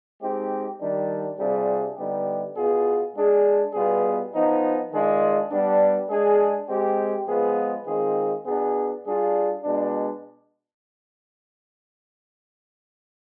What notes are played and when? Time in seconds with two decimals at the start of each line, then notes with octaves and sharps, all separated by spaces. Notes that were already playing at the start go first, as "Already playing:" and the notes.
0.20 G#3 C4 D#4 G4
0.80 D#3 G3 D4
1.38 C3 G3 D4 F4 G#4
1.97 D3 G3 B3 D#4 G4
2.56 B2 B3 F4 G#4
3.16 G#3 D4 G#4
3.73 B2 G3 B3 F4 G#4
4.33 F3 B3 D#4
4.91 D#3 G#3 D4 F4 G#4
5.50 G3 B3 D4
6.09 G#3 D4 G#4
6.69 G#3 C4 G4
7.28 F3 G#3 B3 F4 G#4
7.86 D#3 G#3 C4 F4 G#4
8.45 B2 B3 D4 G#4
9.04 G3 D4 F4 G#4
9.63 B2 G#3 D4